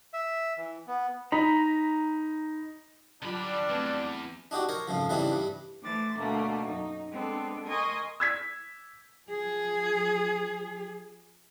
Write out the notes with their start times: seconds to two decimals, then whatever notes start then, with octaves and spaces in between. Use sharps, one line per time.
0.14 E5
0.57 E3
0.87 B3
1.32 D#4 A#5 B5
3.22 D3 F#3 G3 D4 F4 B5
3.70 E2 A3 C4 B4
4.51 D4 D#4 F#4 G4
4.69 A#4 C5 C#5
4.88 F2 G#2 C#3 F3
5.09 C#3 E3 G3 C4 D4 D#4
5.31 G2 G3
5.81 E3 A3 C5 D6 A6
6.17 D2 B2 A3 A#3 D4
6.62 F#2 D#4
7.10 G#3 B3 C4 D4 A4
7.66 A#4 D#5 G#5 C6 C#6 D#6
8.20 E6 G#6 B6
9.28 F3 G#4